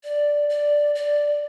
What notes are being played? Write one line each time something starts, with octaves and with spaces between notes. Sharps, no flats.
D5
D5
D5